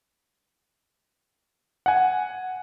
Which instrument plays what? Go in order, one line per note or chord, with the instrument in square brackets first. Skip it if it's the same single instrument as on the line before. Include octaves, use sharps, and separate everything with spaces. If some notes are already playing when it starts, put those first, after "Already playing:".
[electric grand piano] F#5 G#5